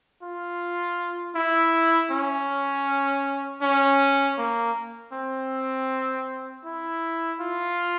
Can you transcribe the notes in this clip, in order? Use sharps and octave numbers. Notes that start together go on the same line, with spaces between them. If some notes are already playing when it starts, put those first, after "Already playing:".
F4
E4
C#4
C#4
A#3
C4
E4
F4